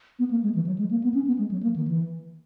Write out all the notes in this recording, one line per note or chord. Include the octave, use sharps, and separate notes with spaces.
B3
A#3
G#3
E3
F#3
G#3
A#3
B3
C#4
B3
G#3
F#3
A#3
D#3
E3